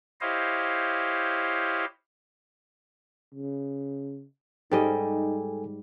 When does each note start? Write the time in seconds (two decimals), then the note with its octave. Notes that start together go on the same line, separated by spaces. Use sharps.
0.21 E4 G4 C5 C#5 D#5 F5
3.35 C#3
4.72 G#2 G3 D#4 A4 D#5 G5 G#5